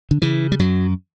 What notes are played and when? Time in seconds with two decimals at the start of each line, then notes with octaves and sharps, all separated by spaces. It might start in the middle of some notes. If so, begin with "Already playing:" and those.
0.11 D3
0.22 C#3 E3
0.52 G3
0.59 F#2 F#3